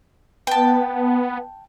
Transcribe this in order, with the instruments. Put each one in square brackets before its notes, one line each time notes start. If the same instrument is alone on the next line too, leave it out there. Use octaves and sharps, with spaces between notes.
[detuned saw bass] B3 [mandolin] G5 A5